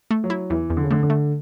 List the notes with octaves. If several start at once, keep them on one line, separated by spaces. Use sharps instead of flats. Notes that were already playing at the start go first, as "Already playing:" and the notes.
A3
F#3
E4
E2 E3
E2
D3
C#3
D3 A3
D3
A3